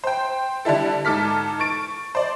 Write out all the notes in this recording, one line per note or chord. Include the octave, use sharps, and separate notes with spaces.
C5 G5
D3 G3 D4 E4 A4
G#2 A4 D6 F6 B6
C#6 A6 D7
C5 D5